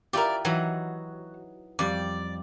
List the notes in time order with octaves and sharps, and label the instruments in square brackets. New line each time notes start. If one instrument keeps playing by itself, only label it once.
[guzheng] E4 F4 G4 [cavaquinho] A#4 D5
[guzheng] E3 F#3 D#4 [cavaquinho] F#4
[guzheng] F2 G3 [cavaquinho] D5